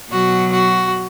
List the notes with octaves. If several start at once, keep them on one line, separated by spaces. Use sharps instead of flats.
B2 F#3 F#4
F#4